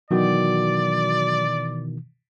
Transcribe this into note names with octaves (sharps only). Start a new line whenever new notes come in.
B2 D#3 E3 F#3 F#4 D5